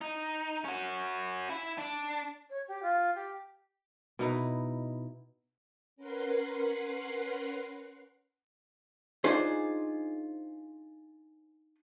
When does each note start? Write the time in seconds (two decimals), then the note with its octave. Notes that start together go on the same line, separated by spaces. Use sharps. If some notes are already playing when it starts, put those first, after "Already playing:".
0.01 D#4
0.65 C#4 F#4
1.50 E4
1.78 D4
2.49 C#5
2.67 G4
2.82 F4
3.14 G4
4.19 B2 D#4 E4
5.96 C#4 A#4 B4 F#5 C6 C7
9.24 D4 D#4 F4 G#4 C5